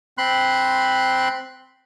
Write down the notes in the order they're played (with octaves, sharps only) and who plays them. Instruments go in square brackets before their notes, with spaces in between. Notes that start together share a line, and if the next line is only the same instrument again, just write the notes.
[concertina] C4 B5 C6 F#6